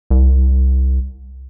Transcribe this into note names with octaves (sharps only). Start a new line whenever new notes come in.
C2